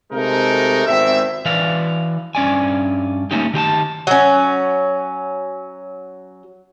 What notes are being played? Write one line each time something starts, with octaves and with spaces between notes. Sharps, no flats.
C3 G#3 A3 D#4 A#4
G#1 E2 C4 E5
E3 B4 D5 F5
G2 C#4 D5 G#5
A3 A#3 C#4 D#4 G4
D#3 G4 G#5 A5
F#3 C#4